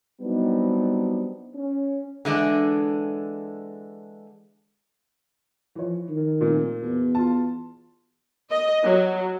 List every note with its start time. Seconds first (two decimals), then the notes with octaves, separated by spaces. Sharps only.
0.22 F#3 G3 B3 C4 D4 D#4
1.55 C#4
2.25 D3 E3 G#3 D4
5.76 E3 F3 C#5
6.09 D#3
6.41 F1 A#2
6.82 E2 B2
7.15 F4 A5
8.50 D#5
8.84 F#3